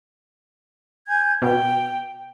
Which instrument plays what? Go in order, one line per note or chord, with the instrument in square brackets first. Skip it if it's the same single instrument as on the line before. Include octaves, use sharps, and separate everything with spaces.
[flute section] G#5 G6 G#6
[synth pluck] B2 [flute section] G5